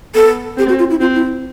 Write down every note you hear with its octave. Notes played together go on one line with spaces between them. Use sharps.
B3 A4
C4 G4
F#4
F4
E4
C4 F4
E4